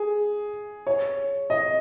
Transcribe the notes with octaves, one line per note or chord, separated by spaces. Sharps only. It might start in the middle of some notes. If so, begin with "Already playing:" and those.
Already playing: G#4
C#5
D#5